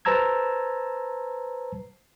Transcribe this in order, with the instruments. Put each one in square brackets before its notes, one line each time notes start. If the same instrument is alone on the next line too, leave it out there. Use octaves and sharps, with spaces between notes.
[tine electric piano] B4 C5 A5 A#5 E6 G#6